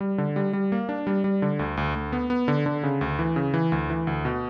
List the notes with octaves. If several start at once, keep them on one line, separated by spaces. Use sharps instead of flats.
G3
D3
G3
G3
A#3
D4
G3
G3
D3
D2
D2
D2
B3
B3
D3
D3
C#3
D2
E3
C#3
E3
D2
E3
D2
B2